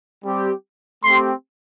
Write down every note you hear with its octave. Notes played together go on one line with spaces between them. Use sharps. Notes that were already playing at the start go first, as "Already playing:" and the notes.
G3 C4 G4
A3 C4 G4 C6